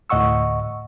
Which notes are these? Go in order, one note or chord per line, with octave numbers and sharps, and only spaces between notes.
D2 A2 D#5 F#5 C#6 E6